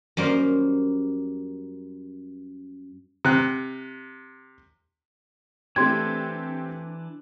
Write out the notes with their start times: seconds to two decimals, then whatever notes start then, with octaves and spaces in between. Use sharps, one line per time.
0.17 F#2 G3 A#3 A#4 C5
3.25 C3 F#6
5.76 E3 A3 C4 D4 G4 C6 G#6